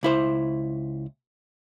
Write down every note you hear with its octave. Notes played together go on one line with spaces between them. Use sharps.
C#2 E4 C5